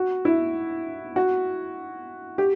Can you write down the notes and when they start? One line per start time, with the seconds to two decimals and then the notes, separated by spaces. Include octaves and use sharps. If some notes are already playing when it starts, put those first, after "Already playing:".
Already playing: F#4
0.25 E4
1.16 F#4
2.38 G4